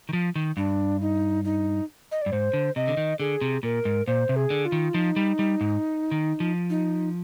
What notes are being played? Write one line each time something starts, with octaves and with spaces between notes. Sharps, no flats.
D#3
F3
D#3
G2 D4
D#4
D#4
D#5
G2 D5
G#2 C5
D3
C3 D#5
D3
D#3
D3 G#4
C3
A#2 A#4
G#2
A#2 C5
C3
G#4
D3
F4
D#3
F3 D#4
G3
G3
G#2
D#3
F3
D#4